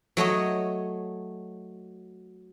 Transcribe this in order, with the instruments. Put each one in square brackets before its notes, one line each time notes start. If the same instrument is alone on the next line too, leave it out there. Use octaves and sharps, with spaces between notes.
[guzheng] F#3 A3 C#5 D#5